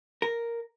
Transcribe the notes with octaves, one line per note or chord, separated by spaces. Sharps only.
A#4